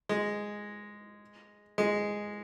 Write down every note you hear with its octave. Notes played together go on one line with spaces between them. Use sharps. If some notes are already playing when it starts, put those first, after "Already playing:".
G#3
G#3